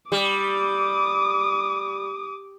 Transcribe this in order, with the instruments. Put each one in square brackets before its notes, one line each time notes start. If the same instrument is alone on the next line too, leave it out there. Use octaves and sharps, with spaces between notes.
[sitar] G3 [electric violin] D6 D#6